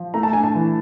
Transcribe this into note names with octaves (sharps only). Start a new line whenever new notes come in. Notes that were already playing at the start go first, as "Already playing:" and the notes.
Already playing: F3
A3 A#5
A5
D4 G#5
A5
E3